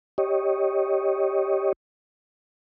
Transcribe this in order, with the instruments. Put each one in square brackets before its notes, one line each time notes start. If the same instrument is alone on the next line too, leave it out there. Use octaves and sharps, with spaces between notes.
[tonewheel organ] G4 C#5 D#5